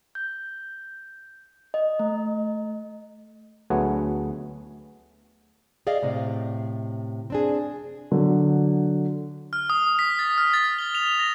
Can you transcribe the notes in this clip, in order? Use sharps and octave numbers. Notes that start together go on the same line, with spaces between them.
G6
D#5
A3
D2 F#3 A3 B3 G#4 F#5
G#4 D5 D#5 F5
A2 C3
C4 D4 G#4
D3 F#3
F6
D#6
B6
A6
F6
A6
G7
F7
A#6